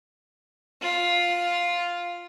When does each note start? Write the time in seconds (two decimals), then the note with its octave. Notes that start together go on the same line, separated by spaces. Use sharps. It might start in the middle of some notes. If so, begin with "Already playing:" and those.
0.81 F4